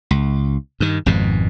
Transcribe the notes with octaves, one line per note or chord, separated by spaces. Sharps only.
C#2
G2 D#3
G#1 F2 G#2 B2